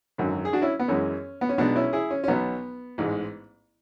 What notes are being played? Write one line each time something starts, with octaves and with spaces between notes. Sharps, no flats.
G#1 F#2 D3 F#3
G#4
D4 F#4
C#4 E4
B3
F#2 E3 G#3 C#4
B3
C#4
B1 B2 G#3 B3 D4
C#4 E4
E4 G#4
C#4
C#4
B1 B2 F#3 B3
A1 G#2 G#3